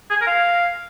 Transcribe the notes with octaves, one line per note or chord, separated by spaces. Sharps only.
G#4
G#5
A#4
F5